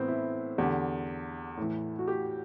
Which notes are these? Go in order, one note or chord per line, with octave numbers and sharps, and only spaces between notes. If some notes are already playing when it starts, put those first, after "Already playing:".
Already playing: A2 E3 B3 C4
E4
E2 D3 G4
A2 E3
F#4
G4